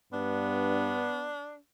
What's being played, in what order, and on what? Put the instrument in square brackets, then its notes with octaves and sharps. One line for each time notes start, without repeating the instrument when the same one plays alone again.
[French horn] G2 [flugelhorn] B3 [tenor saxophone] D4